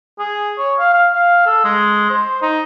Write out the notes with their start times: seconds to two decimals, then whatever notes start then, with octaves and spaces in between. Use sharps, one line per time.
0.19 G#4
0.58 C#5
0.79 F5
0.94 F5
1.14 F5
1.46 A4
1.64 G#3
2.10 C5
2.42 D#4